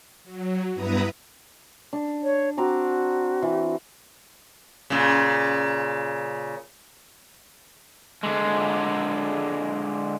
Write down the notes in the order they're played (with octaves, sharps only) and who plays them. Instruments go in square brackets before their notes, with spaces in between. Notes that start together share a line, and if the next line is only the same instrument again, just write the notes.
[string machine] F#3
G2 B3 E4 B4 A#5 D#6
[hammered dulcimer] D4
[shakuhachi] C#5
[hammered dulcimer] C4 A#5 D6 [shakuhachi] F#4
[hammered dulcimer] E3
[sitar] A#2 C#3
[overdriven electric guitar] D3 G#3